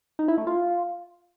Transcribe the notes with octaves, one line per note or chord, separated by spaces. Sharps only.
D#4
E4
A3
F4